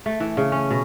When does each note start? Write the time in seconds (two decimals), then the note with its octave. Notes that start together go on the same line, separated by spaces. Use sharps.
0.06 A3
0.20 E3
0.37 C#3
0.52 C#4
0.71 B2